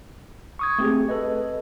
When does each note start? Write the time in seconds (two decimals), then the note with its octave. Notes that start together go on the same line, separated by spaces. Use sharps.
0.59 C#6 D#6 G#6
0.79 A3 C4 G4 G#4
1.09 A4 B4 D#5